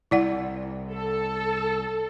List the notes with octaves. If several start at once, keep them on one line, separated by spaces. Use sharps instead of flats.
C2 E4 D5 F#5
A4